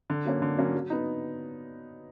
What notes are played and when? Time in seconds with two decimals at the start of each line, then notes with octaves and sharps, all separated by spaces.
0.10 D3
0.25 F#3 A#3 C#4
0.42 D3
0.58 F#3 A#3 C#4
0.74 F#3
0.90 B3 D#4